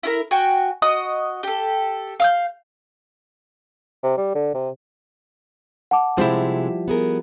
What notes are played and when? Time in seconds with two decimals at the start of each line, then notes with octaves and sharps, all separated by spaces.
0.03 E4 F4 A#4
0.31 F#4 G5 G#5
0.82 F#4 D#5 D#6
1.43 G4 A4
2.20 F5 E6 G6
4.04 C3
4.17 G3
4.35 D3
4.54 C3
5.91 F#5 A5 D6
6.18 C3 F3 G3 G#3 C4 E4
6.88 B3 G#4 A#4